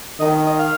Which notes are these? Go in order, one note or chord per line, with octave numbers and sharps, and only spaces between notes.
D#3 D#5
D#5
F5